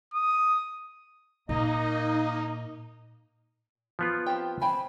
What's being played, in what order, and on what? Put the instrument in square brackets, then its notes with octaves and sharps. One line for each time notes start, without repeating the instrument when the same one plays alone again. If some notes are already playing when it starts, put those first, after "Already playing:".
[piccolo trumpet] D#6
[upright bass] A#2 [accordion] A#3 D#5 [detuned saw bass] D#4
[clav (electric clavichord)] F3 B3 F4
[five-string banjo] C4 G4 G5
[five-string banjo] C4 G5 G#5 [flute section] B5